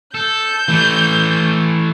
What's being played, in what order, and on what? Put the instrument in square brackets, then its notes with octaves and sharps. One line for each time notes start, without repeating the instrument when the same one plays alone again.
[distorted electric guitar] A4 [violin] G6
[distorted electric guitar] E3 A3